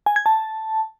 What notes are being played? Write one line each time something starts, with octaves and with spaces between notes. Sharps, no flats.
G#5
G#6
A5